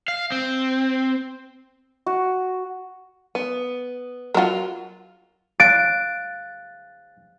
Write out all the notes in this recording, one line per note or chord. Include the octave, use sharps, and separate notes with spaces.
F5
C4
F#4
B3
F#3 F4 F#4 A#4
F5 F#6 A6 D7